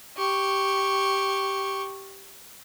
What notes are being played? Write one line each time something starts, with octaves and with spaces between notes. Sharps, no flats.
G4 C#6